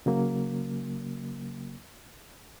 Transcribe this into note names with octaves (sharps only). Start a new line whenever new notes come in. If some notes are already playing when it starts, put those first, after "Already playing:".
C#3 F#3 A#3